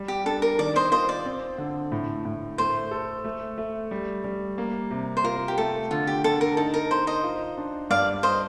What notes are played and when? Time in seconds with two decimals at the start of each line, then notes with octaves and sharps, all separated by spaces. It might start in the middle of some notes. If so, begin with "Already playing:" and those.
Already playing: G3
0.08 G4
0.26 D4 A4
0.42 A#4
0.59 D#3 D5
0.76 C5 D#5
0.91 F4 C5 D#5
1.09 D5
1.25 C4
1.58 D3
1.92 A2
2.25 A2
2.58 A3 C5
2.91 A4
3.25 A3
3.58 A3
3.91 G3
4.24 G3
4.58 A#3
4.91 C3
5.17 C5
5.24 F4 A#4
5.48 G4
5.58 A3 A4
5.91 D3 F4
6.07 G4
6.24 D3 A4
6.41 A#4
6.57 D#4 A4
6.74 A#4
6.91 D#4 C5
7.07 C5 D#5
7.24 F4
7.58 D4
7.90 G2 D5 F5
8.23 C5 D#5